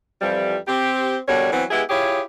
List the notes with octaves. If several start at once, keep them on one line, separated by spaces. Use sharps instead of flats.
F2 E3 F3 G3
C4 G4
B2 D3 G3 A#4 C#5
E3 F#3 B3 C4
G#3 B3 E4 G4 G#4
E4 F4 G4 G#4 C#5